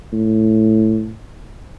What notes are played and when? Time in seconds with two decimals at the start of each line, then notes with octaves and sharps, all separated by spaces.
0.13 A2